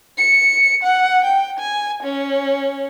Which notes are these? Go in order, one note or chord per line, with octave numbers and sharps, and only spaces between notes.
C#7
F#5
G5
G#5
C#4